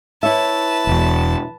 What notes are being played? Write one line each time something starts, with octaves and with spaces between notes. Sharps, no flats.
E4 B4 C#5 E5 A5
E1 E2